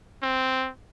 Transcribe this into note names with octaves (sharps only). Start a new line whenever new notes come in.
C4